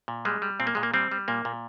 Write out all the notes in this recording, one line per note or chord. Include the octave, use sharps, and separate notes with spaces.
A#2
G3 G#3
G3
A#2 C4
A#3
A#2 G#3
A#3
G3 C4
G3
A#2 A#3
A#2